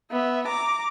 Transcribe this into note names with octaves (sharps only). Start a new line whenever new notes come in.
B3 E5
A#5 D6